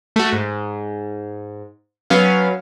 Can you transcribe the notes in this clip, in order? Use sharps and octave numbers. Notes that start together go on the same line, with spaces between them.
A3 F#4
G#2
F#3 B3 C#4 F5